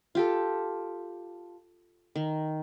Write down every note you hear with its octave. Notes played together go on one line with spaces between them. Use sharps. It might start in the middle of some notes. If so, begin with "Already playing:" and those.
F4 G4 A4
D#3